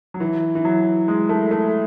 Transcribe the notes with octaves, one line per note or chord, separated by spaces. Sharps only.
F#3
E3
E3
F#3
G#3
A3
A3